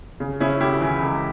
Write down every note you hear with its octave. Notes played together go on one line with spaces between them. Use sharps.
C#3
C#3 C#4 E4
D2 E4 G4
E3
C#2